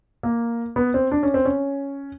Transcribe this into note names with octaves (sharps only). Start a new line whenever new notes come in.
A#3
B3
C4
D4
C#4
C4
C#4